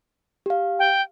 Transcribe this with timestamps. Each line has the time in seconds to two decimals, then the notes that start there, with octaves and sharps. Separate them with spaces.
0.46 G4 F5
0.79 G5